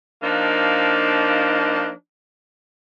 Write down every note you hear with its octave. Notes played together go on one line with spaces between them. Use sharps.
F3 A#3 D4 D#4